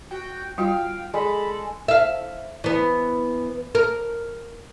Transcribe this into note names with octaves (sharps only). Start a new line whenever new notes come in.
F#4 G5
G3 F4 F#4 F5 G5
G#3 A4 B5
E5 F5
E3 B3
A#4